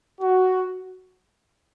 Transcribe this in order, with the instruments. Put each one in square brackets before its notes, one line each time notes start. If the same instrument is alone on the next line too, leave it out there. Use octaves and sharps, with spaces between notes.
[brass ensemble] F#4